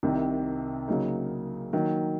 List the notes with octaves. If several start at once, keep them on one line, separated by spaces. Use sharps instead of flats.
C2 C3 D#3
C#3 F#3 A#3 D#4
D#3 F#3 A#3